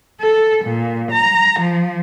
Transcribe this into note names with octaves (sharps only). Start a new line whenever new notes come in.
A4
A#2
A#5
F3